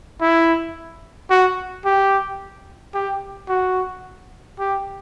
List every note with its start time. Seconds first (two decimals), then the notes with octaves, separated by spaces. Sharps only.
0.21 E4
1.30 F#4
1.85 G4
2.94 G4
3.49 F#4
4.59 G4